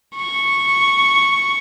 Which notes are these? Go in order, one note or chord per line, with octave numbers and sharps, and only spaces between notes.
C#6